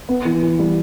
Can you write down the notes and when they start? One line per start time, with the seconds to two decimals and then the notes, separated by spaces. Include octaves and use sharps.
0.09 B3
0.25 E3
0.43 E3
0.59 G3